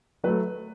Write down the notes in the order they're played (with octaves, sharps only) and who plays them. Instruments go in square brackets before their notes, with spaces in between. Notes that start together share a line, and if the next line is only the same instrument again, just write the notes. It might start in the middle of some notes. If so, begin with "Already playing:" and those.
[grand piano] F#3 A3 [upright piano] B4